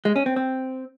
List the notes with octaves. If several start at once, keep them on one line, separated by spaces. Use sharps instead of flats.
G#3
C#4
C4
C4